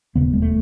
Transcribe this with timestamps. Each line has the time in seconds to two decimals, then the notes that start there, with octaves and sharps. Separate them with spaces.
0.15 E1 D#2 C#3 B3
0.33 G#3
0.42 A3